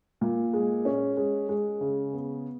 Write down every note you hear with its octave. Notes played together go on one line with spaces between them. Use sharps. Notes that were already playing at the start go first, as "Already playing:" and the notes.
A#2
G#3
C#4
G#3
G#3
C#3
B3